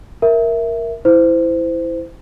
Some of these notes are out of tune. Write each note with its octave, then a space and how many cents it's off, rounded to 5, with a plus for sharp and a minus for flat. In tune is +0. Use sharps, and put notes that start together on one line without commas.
A#4 +0 E5 +0
E4 +0 C5 -25